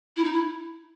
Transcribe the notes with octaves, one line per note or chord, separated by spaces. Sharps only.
E4
D#4
E4